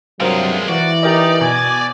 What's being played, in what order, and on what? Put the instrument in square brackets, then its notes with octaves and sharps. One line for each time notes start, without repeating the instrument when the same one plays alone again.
[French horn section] G2 C3 F#3 [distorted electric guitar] G#3 F4 [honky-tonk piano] A#4 C5 F5
[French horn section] E3 [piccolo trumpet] F#4 [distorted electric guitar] D5
[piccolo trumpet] D#4 [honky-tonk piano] G4 A#4 D#5
[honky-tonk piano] B2 [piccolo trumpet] G#5